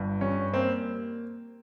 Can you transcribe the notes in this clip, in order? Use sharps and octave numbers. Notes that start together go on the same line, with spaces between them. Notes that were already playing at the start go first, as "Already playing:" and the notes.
Already playing: G1 G2
G3 C#4
A#3 C4